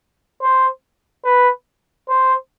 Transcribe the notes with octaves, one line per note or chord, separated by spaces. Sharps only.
C5
B4
C5